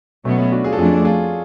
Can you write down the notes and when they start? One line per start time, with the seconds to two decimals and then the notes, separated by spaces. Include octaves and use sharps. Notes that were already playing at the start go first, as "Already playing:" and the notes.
0.25 B2 F#3 A3 B3 C#4
0.38 A3 C#4
0.52 D4 F#4
0.64 F4 G#4
0.73 A4
0.78 F2 F3 A3 D4 F4 G#4
1.05 F4 G#4